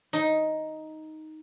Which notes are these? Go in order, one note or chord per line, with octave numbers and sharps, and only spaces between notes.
D#4